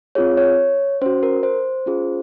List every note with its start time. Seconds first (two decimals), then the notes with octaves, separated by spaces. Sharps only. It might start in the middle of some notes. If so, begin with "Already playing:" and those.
0.15 C4 F4 G#4 C#5
0.37 C#5
1.01 C#4 F#4 C5
1.23 A#4
1.43 C5
1.86 C#4 F4 G#4